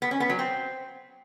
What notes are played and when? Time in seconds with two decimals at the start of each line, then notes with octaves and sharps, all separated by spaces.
0.02 B3
0.11 C#4
0.20 B3
0.30 F#3
0.39 C4